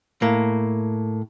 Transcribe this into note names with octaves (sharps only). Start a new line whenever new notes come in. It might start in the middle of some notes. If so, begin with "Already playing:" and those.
A2 A#3